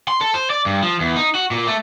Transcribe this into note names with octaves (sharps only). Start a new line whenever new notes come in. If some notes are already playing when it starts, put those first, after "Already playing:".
C6
A4
C5
D5
G2
F3
E2
D#4
F#4
A#2
A3